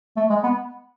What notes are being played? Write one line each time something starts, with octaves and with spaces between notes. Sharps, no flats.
A3
G#3
B3